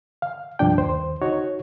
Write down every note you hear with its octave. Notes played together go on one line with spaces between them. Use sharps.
F5
C2 G2 F3 D4 G5
D#2 C5
D#4 F#4 C#5